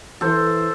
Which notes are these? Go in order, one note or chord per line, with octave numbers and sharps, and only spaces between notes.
E3 A4 C5